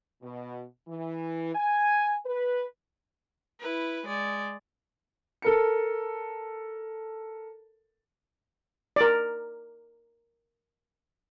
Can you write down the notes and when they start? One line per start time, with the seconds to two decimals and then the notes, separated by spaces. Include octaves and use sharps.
0.22 B2
0.88 E3
1.55 G#5
2.26 B4
3.60 E4 B4
4.06 G#3 D5
5.42 A4 A#4 C#7
8.96 A#4 D5